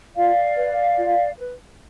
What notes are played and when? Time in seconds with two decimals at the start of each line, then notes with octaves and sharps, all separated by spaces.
0.15 F4 D5 F5
0.57 B4
0.98 F4
1.38 B4